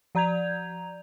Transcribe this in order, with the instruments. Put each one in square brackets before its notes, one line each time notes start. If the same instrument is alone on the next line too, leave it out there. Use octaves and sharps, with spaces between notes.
[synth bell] F3 D5 A#5 G6 G#6 F7